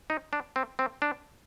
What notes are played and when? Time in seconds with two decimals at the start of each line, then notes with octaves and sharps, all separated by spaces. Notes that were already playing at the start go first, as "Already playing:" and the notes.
0.10 D#4
0.33 D4
0.56 C4
0.79 C4
1.02 D4